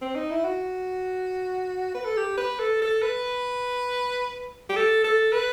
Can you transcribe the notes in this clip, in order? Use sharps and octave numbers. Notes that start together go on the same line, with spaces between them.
C4
D#4
E4
F#4
B4
A4
G4
B4
A4
A4
B4
G4
A4
A4
B4